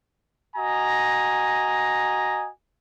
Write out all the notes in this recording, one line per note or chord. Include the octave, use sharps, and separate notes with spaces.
F#4 D#5 G#5 A#5